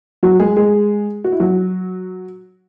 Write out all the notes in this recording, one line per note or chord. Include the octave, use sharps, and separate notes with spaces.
F#3 F#4
G#3 G#4
G#3 G#4
F#4
E4
F#3 F#4